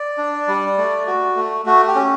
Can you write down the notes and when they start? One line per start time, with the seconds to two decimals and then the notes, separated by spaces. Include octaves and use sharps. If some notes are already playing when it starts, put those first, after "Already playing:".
Already playing: D5
0.18 D4
0.48 G3
0.78 A3
1.07 F#4
1.36 A3
1.66 A3 F#4
1.87 G4
1.95 C#4